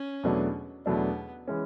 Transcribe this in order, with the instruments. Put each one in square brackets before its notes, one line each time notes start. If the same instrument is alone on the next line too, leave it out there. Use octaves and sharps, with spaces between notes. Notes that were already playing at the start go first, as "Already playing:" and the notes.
Already playing: [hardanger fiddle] C#4
[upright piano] E2 B2 F#3 A3 D4
[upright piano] E2 B2 F#3 A3 D4 [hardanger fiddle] B3
[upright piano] E3 G#3 C#4